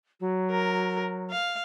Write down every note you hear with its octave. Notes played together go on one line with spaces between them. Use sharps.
F#3
A#4
F5